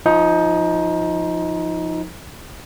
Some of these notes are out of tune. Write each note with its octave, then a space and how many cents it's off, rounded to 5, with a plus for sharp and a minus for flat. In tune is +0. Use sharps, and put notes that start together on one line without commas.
F3 +0 D#4 +20